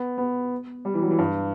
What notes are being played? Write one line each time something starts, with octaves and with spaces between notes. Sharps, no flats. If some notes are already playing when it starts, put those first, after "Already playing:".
Already playing: B3
B3
G3
E3
F#3
E3
G2